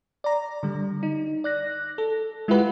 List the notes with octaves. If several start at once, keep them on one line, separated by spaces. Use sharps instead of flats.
D5 A#5
D3 G3
D#4
D5 F#6 A#6
A4
G#3 E4 F4 G4 B4 F#5